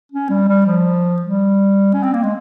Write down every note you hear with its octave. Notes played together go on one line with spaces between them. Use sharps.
C#4
G3
G3
F3
G3
C#4
C4
A#3
G#3